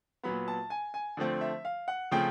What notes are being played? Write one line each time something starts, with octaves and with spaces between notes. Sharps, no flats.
A#2 F#3 B3 B5
A5
G#5
G#5
D3 F3 A3 C4
E5
F5
F#5
C#3 F3 A3 C4 G5